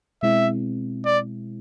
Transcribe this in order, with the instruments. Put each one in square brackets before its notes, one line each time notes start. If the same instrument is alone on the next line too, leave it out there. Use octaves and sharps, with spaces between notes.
[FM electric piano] B2 G#3 C4 E4 [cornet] E5
[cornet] D5